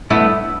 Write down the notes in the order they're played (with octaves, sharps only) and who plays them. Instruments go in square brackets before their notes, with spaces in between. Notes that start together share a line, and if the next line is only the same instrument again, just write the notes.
[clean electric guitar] A3 B3 [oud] E4